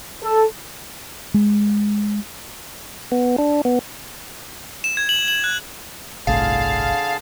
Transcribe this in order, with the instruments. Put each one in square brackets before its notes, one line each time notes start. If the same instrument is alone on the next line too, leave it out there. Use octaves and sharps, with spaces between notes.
[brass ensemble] A4
[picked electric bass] G#3
[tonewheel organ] B3
D4
B3
[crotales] E7
G#6
F#7
F#7
F#6
[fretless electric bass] G1 C2 A2 [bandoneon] D3 G#4 A5 [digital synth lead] F5